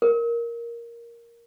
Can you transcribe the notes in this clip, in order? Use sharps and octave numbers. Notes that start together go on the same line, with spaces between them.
A#4